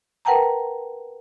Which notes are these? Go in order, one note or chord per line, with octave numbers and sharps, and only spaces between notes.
A#4 B4 F#5 G5 A5 A#5